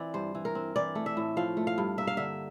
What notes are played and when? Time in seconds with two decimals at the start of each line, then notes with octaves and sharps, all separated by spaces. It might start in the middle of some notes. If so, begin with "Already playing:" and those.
Already playing: E3 C4 D5
0.14 G2 C5
0.35 E3
0.45 A#4
0.55 C4
0.76 E3 D5
0.95 A3
1.06 E5
1.17 A2
1.37 F3 F5
1.57 A3
1.67 F5
1.78 G2
1.98 A#3 E5
2.07 F5
2.17 D3 E5